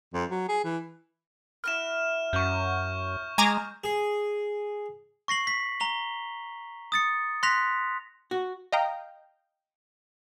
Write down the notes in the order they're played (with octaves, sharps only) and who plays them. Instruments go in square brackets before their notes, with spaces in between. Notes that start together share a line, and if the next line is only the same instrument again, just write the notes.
[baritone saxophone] F2
F#3
G#4
E3
[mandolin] E4 F#4 B4 [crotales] F6 E7
[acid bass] F#2 [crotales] C#6 G6
[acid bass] G#3 [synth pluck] G#5 A#5 D6
[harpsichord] G#4
[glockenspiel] C#6 A#6 C7 F#7
B6
A#5 F7 G7
D#6 A6 C#7
C6 F#6 A#6 B6 F7
[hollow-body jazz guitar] F#4
[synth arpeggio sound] D#5 F5 G5 A#5